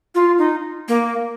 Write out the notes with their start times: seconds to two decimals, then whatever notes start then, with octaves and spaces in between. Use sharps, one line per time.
0.15 F4
0.38 D#4
0.88 A#3